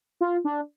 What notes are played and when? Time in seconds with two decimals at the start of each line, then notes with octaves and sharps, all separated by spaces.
0.21 F4
0.45 D4